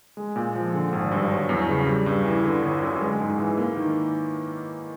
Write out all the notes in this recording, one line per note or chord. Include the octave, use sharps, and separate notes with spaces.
G#3
A#2
F3
D3
G#1
G2
F#3
E2
C#3
G3
G2
E3
D3
G1
F#2
G#3
G#2
E3
A#3
D#3